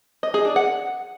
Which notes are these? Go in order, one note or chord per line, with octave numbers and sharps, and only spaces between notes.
D#5
G#4
D4
F#5